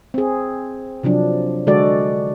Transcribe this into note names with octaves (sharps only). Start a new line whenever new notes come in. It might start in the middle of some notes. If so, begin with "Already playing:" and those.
C4 G#4
C3 F3 F#3 D4
D3 G#3 F#4 A4 D5